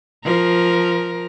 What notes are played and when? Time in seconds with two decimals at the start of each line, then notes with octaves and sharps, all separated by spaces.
0.24 F3 A#4